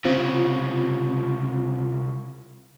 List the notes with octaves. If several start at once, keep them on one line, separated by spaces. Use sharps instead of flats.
C2 C#3 C4 F4